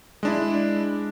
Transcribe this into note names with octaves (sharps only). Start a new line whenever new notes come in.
G#3 D4 E4